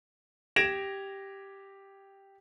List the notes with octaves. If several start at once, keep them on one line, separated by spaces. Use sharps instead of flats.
G4 G#6 A#6 D7 E7 F7